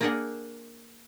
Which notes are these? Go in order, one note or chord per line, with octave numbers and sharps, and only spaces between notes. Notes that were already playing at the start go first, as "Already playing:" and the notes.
A#3 D4 G#4 A#4 F#5 G#5